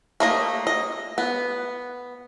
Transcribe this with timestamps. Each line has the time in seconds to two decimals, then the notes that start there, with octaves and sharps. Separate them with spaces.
0.20 A3 A#3 D#5
0.67 D#5
1.18 B3